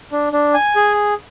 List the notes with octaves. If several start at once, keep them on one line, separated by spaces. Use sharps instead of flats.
D4
D4
G#5
G#4